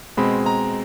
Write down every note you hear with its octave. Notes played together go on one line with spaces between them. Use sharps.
B2 G#3 C4 B5
A#5